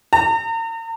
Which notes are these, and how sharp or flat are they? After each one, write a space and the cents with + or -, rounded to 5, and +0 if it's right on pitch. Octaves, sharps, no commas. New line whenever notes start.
A#5 -40